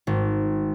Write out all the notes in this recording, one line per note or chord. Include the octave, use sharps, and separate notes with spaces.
G#1